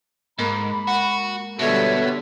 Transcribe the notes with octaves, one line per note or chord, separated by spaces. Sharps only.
G#2 G#3 A#3 A#4 B5
F#4
B2 D3 G3 B3 C#5 E5